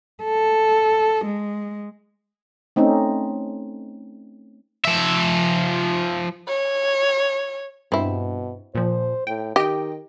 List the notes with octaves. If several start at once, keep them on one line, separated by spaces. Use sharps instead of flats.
A4
G#3
A3 C4 C#4 D#4
F3 E5
C#5
G2 B2 C4 E4
A#2 F3 C5
A2 G5
D#3 G4 D#5 G5